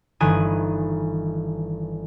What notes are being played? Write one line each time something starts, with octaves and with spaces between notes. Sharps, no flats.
G1 D#3 E3 G#5 D#6 F#6